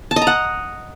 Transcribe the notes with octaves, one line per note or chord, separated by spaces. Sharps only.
A5
D#5
A#5
F#5